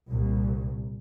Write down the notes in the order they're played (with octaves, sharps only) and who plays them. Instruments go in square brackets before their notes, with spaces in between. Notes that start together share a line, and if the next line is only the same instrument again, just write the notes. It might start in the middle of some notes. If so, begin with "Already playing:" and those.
[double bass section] C2 A#2